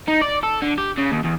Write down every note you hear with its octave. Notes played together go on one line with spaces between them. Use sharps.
D#4
D5
A4
D3
G4
C#3
D#2
E2